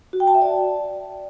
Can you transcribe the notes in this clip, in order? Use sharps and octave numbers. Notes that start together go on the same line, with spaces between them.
F#4
G5
A5
E5
D5